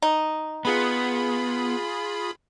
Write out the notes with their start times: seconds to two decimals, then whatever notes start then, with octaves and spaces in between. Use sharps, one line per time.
0.02 D#4
0.65 B3 F4 G#4 B5